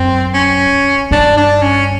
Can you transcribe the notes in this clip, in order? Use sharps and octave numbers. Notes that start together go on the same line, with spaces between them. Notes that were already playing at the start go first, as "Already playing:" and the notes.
Already playing: F#2 C4
C#4
G2 D4
D4
C#4